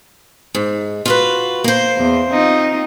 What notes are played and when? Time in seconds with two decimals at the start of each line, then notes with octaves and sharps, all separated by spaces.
0.55 G#2
1.06 F4 F#4 B4
1.64 A#3 C5
1.97 E2
2.30 C4 D#4 F4